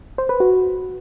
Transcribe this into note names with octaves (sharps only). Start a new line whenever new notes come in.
C5
B4
F#4